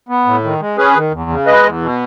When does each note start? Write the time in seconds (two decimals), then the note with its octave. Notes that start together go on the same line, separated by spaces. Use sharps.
0.09 B3
0.26 A2
0.44 D#3
0.60 G#3
0.77 C#4 G#4 B4
0.96 D#3
1.12 E2
1.30 C#3
1.46 G#3 B4 D#5
1.63 E2
1.82 B2